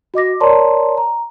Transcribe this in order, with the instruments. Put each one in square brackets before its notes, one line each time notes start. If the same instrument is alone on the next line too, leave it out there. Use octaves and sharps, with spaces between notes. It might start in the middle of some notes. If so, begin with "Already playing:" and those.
[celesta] F#4 D#5 D6 A#6
A#4 C#5 D5 A5 A#5 C6
A#5